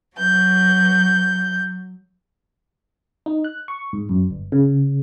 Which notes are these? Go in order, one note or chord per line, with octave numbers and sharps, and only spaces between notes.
F#3 G6
D#4
F#6
C#6
G#2
F#2
G1
C#3